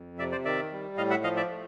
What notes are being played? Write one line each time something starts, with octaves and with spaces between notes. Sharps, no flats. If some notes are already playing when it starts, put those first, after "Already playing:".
Already playing: F2
C3 D5 E5
C5 D5
D#3 D5 E5
G3
A2 D#5 F5
E5 F#5
F3 D#5 F5
D5 E5
A3